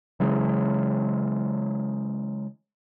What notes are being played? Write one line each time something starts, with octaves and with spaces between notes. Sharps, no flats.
C#3 E3 F#3 G#3